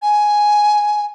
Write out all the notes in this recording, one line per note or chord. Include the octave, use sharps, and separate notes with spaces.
G#5